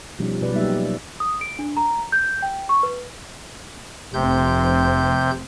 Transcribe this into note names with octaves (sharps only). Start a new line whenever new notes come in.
B2 F3 G3 C#4 D#4
B2 B4 D5
F#3 G3 A#3 D#4 G4 E5
D#6
D7
D4
A#5
G6
G5
C#6
B4
F1 C3 C4 G6